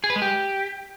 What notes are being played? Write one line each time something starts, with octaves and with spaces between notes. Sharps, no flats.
G#4
B4
G#3
G4